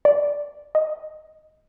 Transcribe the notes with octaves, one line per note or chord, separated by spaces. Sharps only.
D5
D#5